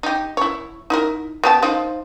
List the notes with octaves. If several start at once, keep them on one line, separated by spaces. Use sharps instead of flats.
D#4 G4
E4 C#5
D#4 E4 A#4
B3 G4 A5
F3 D#4